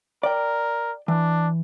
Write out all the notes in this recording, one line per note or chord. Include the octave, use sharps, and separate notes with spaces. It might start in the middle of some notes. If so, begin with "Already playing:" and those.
A#4 D5 G5
E3 D4